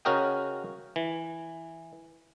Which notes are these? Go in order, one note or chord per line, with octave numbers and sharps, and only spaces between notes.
C#3 C#4 F#4 A#4 D#5 G5
E3